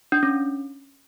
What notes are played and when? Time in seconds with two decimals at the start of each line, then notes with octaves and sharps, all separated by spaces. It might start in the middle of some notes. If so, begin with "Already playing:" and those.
0.12 D4
0.23 C#4